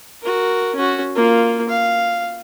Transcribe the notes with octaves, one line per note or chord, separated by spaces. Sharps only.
F#4 A#4
C#4 F#4
A#3 F4
F5